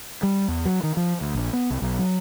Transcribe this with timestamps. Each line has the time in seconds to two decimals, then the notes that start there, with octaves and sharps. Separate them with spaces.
0.23 G3
0.48 E2
0.65 F#3
0.83 D#3
0.97 F3
1.21 D2
1.35 A#1
1.53 B3
1.70 C2
1.82 B1
1.99 F#3